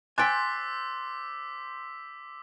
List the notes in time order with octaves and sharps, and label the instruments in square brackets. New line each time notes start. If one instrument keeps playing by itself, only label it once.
[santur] C5 [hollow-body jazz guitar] G5 G#5 [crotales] D6 E6 B6 [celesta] F#6 A6